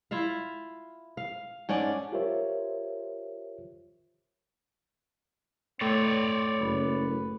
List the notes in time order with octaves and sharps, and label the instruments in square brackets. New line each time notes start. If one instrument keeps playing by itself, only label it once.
[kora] E4 F4 E5 F5
F5
G#2 C#4 D4 D5
[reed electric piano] F4 G4 A#4 C5 C#5 E5
[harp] A2 [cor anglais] C4 [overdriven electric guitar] C#5 D5
[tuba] F#1 [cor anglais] B4